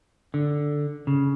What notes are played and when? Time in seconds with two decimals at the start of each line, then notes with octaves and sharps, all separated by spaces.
0.34 D3
1.07 C#3